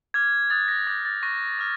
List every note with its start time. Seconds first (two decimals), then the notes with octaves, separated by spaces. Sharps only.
0.14 D6 F6 G#6
0.50 D#6 F#6 A6
0.68 A#6
0.87 D6 G6 A6
1.05 A6
1.23 C#6 F#6 A#6
1.59 D6 F6